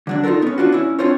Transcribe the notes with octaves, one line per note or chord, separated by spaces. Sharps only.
D3 F#3 D4
D#4 F4 F#4 A4 A#4
B3 C#4
E3 D4 F4 F#4
C#4 E4
C4 D4 F4 C5 C#5